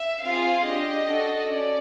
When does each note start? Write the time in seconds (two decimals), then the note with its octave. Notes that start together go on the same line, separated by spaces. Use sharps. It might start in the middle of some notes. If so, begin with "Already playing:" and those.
Already playing: E5
0.23 C4 F4 G#4 F5
0.65 D4 G4 D#5
1.07 D4 F#4 A4
1.48 C#4 D5